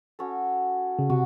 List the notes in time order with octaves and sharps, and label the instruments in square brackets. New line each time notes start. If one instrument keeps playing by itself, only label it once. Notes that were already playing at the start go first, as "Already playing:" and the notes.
[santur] C#4 F#4 A4
[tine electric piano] C#3
[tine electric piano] C3 [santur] F#4